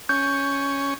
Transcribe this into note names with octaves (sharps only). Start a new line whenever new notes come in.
C#4 G6